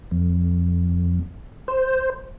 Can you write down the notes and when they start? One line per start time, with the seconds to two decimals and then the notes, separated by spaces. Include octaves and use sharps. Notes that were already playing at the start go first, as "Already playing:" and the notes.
0.11 F2
1.68 C5